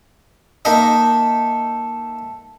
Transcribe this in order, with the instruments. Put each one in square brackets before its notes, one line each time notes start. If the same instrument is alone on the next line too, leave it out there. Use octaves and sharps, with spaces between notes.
[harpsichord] A#3 D#4 D#5 [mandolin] A4 E5